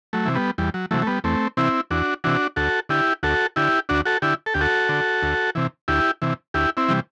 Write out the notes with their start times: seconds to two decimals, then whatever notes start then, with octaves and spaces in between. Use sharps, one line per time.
0.13 F#3 A3
0.25 C3 E3
0.35 G3 B3
0.58 E2 G3
0.74 F#3
0.91 C3 E3 F#3 A3
1.02 A3
1.07 G3 B3
1.24 E2 A3 C4
1.57 C3 E3 C4 E4
1.91 E2 D4 F#4
2.24 C3 E3 D4 F#4
2.56 D2 F#4 A4
2.89 D3 E4 G4
3.23 D2 F#4 A4
3.56 D3 E4 G4
3.89 D2 D4 F#4
4.05 F#4 A4
4.22 D3 E4 G4
4.46 A4
4.54 D2 G4
4.61 F#4 A4
4.89 D3
5.23 D2
5.55 C3 E3
5.88 D2 E4 G4
6.22 C3 E3
6.54 D2 E4 G4
6.77 C4 E4
6.89 C3 E3 G3